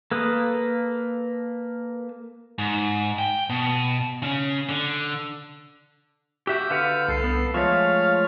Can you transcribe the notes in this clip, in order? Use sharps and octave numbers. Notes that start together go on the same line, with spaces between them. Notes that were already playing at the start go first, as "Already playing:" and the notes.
A#3 A4 B4 D#6
G#2
G5
B2
C#3 C#4
D3
F#4 G4 E5 E6 G6
D3 B4 F5 F#5
C2 A4 C7
B3
F3 G#3 A3 C#5 F5 C#6